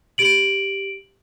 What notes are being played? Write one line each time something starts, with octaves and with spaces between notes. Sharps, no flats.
G4 D7 F#7